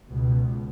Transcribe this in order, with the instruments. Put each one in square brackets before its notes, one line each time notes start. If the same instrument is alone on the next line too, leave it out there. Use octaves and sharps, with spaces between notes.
[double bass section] C#2 B2